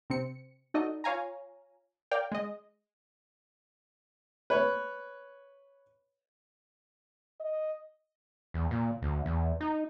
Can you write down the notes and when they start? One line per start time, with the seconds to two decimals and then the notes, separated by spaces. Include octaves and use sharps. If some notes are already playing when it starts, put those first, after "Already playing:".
0.10 C3 C4 C#7
0.74 D#4 F#4 A4 D5 D#5
1.04 F4 C#5 F5 G#5 A#5
2.11 A#4 D5 F5 G5
2.32 G#3 D#5
4.50 B4 C#5
7.40 D#5
8.54 E2
8.71 A#2
9.02 D2
9.26 E2
9.61 D#4